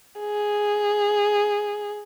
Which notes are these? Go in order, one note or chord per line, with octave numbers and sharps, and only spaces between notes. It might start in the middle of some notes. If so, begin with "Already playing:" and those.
G#4